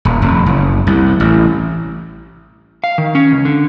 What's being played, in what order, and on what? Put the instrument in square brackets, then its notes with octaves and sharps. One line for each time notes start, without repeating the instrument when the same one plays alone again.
[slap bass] D#1
F1
F#1
C2
A1
[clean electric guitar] F5
D#3
C#4
C#2
D3